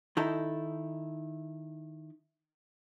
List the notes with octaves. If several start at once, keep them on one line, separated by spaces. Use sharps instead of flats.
D#3 D#4 E4 A4